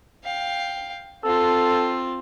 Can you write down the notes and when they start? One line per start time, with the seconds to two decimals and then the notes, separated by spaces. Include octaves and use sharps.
0.24 F5 G5
1.24 C4 F4 A4